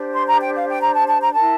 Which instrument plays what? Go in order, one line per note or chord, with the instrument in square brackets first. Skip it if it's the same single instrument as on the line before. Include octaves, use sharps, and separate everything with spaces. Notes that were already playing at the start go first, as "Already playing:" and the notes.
Already playing: [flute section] D4 G4 C5
C6
A#5
G5
F5
G5
A#5
A5
A5
A#5
E4 A#4 A5